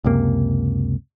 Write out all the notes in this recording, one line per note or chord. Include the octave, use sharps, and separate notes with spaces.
C#2 F#2 C3 A#3